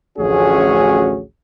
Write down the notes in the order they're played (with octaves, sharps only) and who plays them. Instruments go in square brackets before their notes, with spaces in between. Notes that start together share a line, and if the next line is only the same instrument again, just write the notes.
[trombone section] A1 D2 F3 C#4 F#4 G#4